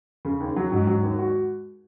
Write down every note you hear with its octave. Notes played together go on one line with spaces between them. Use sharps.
C#3
D#2
F#3
G#2 F#3
F#3
D#2
F#4